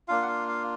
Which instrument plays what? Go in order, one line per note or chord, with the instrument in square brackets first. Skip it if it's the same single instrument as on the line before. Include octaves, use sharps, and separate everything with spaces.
[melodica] A#3 D4 F4 F5
F#5
F5
F5